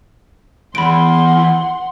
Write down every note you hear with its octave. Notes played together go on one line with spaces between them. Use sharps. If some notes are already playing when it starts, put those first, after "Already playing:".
E2 E3 F#5 B5 C6 D7